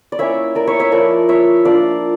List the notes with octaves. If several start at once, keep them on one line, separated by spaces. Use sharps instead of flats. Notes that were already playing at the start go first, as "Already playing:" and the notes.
D5
A#3 C#4 E4 C#5 E5
A#4 D5
C#5 E5
C#5 E5
F3 A3 E4 A#4 D5
C#5 E5
A#3 D4 F4 D5 F5